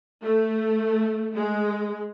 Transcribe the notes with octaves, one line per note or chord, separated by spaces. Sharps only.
A3
G#3